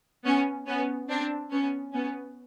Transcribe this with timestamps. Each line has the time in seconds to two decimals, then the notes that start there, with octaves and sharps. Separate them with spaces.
0.25 B3 C#4
0.67 B3 C#4
1.09 C4 D4
1.50 B3 C#4
1.93 B3 C#4